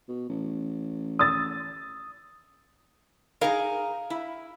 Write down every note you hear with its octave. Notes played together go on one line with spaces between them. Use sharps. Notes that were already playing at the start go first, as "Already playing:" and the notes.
B2
A1
D#6 E6 A6
D#4 G#4 A#4 F5
E4